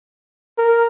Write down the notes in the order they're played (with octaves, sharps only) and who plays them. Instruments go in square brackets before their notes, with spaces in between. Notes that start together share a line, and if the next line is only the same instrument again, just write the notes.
[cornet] A#4